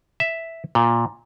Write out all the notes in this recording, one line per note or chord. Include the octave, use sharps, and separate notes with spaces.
E5
A#2